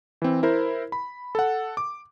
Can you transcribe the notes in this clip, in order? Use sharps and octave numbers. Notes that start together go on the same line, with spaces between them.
E3 C4
E4 A#4 C5
B5
A4 F#5
D6